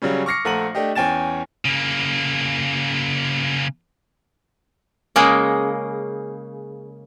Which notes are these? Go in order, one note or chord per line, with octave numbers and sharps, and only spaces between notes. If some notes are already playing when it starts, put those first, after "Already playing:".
C#3 F#3 G3 C#4
C#6 D6 F6 A#6 C7 C#7
A#1 A3 F#5 A#5 D#7 F#7
A3 D4 G4 D#5
E2 C#4 G5 G#5 A6 E7
C#3 A#3
C#3 G#3 A#3